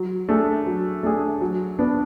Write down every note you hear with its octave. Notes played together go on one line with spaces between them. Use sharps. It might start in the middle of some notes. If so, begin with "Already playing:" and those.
Already playing: F#3
A3 D4 G#4
F#3
A3 D4 G#4
F#3
B3 D4